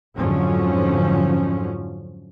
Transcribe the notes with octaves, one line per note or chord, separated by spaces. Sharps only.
F2 G#2 D3 F3 F#3 C#4